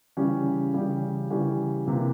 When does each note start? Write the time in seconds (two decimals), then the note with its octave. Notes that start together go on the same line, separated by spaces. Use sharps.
0.17 C#3 E3 G3 C#4 G4
0.74 C#3 E3 G3 C#4 G4
1.30 C#3 E3 G3 C#4 G4
1.86 C3 E3 A#3